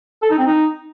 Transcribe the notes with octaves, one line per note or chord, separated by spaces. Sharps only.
A4
D#4
C4
D#4